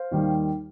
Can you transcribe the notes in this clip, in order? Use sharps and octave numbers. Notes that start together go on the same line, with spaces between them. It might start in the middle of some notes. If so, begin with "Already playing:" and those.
Already playing: C5 F5
D#2 D#3 G3